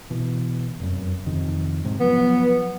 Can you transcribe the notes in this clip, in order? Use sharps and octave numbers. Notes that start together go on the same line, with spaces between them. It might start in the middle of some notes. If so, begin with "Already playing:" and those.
B2 E3
F1 F#2
F2 C3 D#3
G#2 C3 G#3
F3 F#3 B3